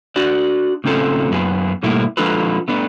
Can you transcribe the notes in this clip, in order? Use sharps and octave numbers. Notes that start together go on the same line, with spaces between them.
D4 F#4 D5
A2 C#3 C4 C#4 F4 A4
F#2 B3 F#4 G#4
G#2 B2 G3 A3 A#3 E4
F3 G#3 D4 F4 A4 B4
A3 B3 D4